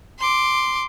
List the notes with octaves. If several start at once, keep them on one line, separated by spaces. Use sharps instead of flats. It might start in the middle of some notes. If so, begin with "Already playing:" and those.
C6 D6